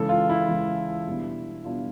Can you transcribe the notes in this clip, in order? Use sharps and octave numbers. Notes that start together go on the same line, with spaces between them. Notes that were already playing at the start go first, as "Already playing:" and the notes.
Already playing: C#3 E3 G#3 A4
F4
E4
C#3 E3 G#3
B2 G3 B3 D4
B2 G3 B3 D4 F4